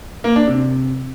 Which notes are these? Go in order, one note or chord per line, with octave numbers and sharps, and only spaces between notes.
A#3
D4
C3